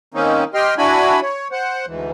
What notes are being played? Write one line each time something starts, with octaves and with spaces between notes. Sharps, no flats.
D#3 A#3 C4 C#4 D#4
G4 D#5 G5 C6 F6
D4 E4 F#4 G#5 B5
C#5
C5 F#5
D2 G#2 E3